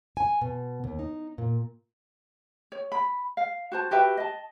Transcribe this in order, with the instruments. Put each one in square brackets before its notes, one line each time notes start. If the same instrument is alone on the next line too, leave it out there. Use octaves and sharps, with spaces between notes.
[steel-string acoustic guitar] G#5
B2
D#2
D#4
A#2
[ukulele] C#5
B5
F5
F#4 C5 A5
F#4 G4 B4 E5
D#5 A5